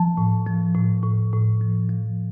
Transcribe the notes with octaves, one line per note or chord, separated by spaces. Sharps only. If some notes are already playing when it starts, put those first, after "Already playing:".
Already playing: F3 A5
A2
F3
A2
A2
A2
F3
F3